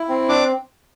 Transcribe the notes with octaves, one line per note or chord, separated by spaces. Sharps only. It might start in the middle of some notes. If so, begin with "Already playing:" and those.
Already playing: E4
C4
D4 D6